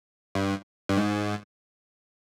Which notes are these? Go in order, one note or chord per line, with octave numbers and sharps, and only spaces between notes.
G2
G2
G#2